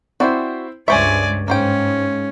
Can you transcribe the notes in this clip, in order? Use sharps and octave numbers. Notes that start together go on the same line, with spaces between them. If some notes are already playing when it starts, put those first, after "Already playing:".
C4 E4 F#4 C5 D5
C#2 G2 C#4 C5 D5 E5 G#5 C#6
G#2 A#3 C#4 C5 G5